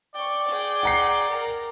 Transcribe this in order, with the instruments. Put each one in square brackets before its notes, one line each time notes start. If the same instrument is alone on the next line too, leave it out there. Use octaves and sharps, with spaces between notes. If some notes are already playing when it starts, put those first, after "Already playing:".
[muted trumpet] D5 [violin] G5 C#6
[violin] G#4 G5
[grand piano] F#5 A#5 C7
[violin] A#4